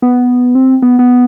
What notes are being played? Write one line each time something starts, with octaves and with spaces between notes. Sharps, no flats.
B3
C4
B3
B3